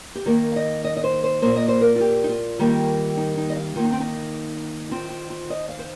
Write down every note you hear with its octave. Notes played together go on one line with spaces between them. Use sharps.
G4
D#3 A#3 A#4
F5
D#5
D#5
D#5
C5
C5
A#2 A#3 C5
D#5
C5
A#4
F4
G4
D#4
F4
D#3 G3 A#3
D#4
D#4
D#5
F5
D#3 A#3 F4
D#4
C4
D#4
D#3 C4 F4
F4
F4
D#5
F5
C5